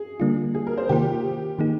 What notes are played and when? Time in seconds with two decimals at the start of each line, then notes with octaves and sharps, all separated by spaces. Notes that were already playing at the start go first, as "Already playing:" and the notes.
Already playing: G#4
0.20 D3 G3 A#3 D4 F4
0.54 G#4
0.67 A#4
0.78 C5
0.89 C3 D#3 A#3 F4 G4
1.59 D#3 A#3 D#4 G#4